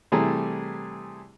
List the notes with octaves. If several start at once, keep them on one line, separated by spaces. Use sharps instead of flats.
C3 E3 G3 A3 G#4 A#5